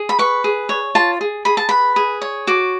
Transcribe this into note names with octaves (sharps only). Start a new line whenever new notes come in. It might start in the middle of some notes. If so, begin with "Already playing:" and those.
Already playing: G#4
B5
B4 C#6
G#4
C#5
F4 A5
G#4
G#4 B5
A5
B4 B5
G#4
C#5
F#4 D6